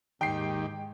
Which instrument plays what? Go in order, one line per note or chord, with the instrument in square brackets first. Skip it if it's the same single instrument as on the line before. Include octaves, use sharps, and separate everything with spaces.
[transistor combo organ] D#2 D#3 G4 [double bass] G#2 G#3 [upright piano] G5 C7